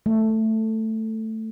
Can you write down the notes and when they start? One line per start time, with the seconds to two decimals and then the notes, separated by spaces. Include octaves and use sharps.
0.06 A3